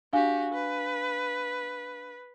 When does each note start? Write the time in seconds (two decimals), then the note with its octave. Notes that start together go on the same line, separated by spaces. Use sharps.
0.13 D4 F#4 G4 F5 G#5
0.54 B4